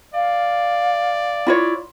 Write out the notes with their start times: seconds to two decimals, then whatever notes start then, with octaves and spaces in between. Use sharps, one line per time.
0.14 D5 F5
1.47 E4 F4 C#5